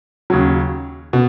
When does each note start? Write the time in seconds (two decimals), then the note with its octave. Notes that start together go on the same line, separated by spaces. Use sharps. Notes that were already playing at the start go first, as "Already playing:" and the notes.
0.30 D#2 C#3 F#3
1.13 B2